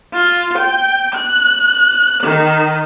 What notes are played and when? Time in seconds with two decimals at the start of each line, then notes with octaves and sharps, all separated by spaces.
0.13 F4
0.58 G5
1.14 F#6
2.23 D#3